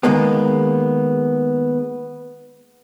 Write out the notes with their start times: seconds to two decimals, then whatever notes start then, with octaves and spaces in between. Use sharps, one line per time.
0.03 D#3 G#3 A#3 B3